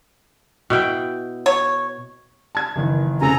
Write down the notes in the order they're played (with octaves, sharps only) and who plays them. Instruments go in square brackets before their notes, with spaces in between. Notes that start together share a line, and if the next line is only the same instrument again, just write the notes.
[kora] B2 E4 G5
[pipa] C#5
[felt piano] A5 G#6
F#1 D#3 E3
[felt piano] F1 C#3 [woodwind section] A4 G#5 A#5